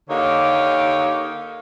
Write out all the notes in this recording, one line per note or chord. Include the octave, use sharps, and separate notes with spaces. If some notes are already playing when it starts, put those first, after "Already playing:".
D3 A#3 D#4 G4 C#5